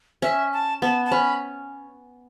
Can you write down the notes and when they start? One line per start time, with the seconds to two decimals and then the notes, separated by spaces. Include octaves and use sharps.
0.22 C#4 E5
0.53 A5
0.82 B3 A5
1.05 A5
1.12 C#4 B5